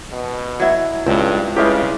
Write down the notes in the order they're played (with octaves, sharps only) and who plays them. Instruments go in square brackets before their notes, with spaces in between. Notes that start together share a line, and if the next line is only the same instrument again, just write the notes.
[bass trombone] B2
[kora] F#3 E4
[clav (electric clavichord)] C#2 [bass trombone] G2 [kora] C4
[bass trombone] C#3 [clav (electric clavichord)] G3 G#3 G4 [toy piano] E4 B4 E5